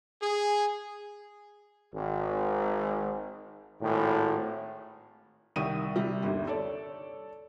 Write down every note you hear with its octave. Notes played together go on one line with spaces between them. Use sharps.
G#4
G#1
G#1 A2
C2 D#3 E5 C#6 D#6 D#7
C3 G3
G1 D#2
A4 C#5 D5